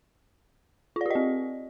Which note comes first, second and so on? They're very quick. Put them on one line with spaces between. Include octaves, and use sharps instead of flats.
F4 D5 G4 D#5 C4